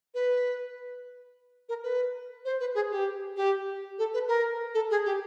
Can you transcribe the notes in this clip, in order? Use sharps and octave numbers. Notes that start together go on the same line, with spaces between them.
B4
A#4
B4
C5
B4
G#4
G4
G4
A4
B4
A#4
A4
G#4
G4